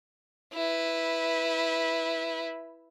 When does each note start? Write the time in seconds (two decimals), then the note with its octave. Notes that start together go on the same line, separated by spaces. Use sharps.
0.54 E4 B4